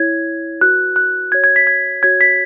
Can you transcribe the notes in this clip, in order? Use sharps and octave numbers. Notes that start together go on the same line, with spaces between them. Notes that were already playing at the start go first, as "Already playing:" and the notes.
Already playing: E4 C#5 G#6
F#4 B4 F#6
F#6
F#4 C#5 G#6
G#6
B6
G#6
F#4 C#5 G#6
B6